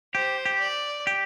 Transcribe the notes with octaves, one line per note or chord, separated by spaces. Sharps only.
G4 C5
G4
D5
G4